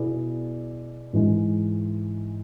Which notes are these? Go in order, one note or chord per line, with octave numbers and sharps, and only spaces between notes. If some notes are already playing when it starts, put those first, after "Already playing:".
Already playing: B2 B3 E4 G#4 D5
G#2 E3 G#3